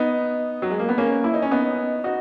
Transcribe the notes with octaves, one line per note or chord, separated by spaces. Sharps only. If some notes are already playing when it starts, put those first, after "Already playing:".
Already playing: B3 D#4
F#3
G#3
A#3
B3
A#3 C#4
E4
D#4
C#4
B3 D#4
D#4 F#4